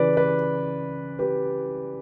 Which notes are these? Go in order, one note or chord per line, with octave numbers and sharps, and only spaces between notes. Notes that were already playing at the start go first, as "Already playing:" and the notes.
Already playing: C#3 E3 B4 D5
B4 D5
G4 B4